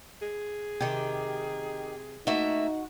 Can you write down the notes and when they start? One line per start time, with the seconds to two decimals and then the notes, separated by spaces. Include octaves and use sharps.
0.22 G#4
0.81 C3 D#3 G4
2.27 A3 A#3 D#4 F#4 E5